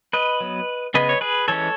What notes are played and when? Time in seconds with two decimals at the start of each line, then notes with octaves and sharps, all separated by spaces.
0.13 B4 D#5
0.40 F#3 B3
0.94 C#3 G#3 B3 B4 D#5
1.09 C#5
1.21 G#4 B4
1.48 E3 G#3 C#4 A4 C#5